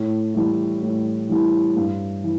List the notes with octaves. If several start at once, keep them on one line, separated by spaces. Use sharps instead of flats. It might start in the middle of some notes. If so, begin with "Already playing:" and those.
Already playing: A2
E3 G3 E4
A2
E3 G3 E4
G2
E3